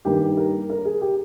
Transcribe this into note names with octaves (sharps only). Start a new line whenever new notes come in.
G2 D#3 G3 A#3 G4
A#4
A#4
G#4
G4